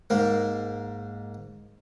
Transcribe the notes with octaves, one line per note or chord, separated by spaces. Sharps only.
G#2 A#3